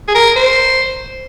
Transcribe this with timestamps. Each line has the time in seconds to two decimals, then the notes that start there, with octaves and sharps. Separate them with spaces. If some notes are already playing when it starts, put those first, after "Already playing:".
0.08 G#4
0.15 A#4
0.36 C5